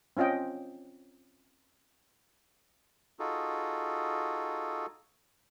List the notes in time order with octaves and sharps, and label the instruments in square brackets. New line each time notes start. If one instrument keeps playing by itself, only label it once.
[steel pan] C4 C#4 F4 D#5 G5
[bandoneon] D#4 F4 F#4 G#4 A4